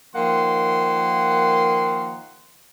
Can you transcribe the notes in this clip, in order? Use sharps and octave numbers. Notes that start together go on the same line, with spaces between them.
D#3 F3 A#3 F#5 C6